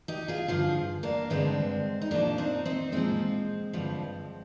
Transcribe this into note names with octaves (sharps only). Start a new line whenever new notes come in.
D#4 G4
F4 G#4
G2 D3 F3 F4 G#4
A#3 D4
G2 D3 F3 G#3 C4
D#4
A#2 F3 A#3 D4
C4 D#4
C4 D#4
A#2 F3 G#3 C4
G2 D3 F3